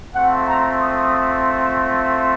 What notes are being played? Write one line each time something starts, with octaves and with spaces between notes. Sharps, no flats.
A3 C4 F4 F#5
A#5
D#6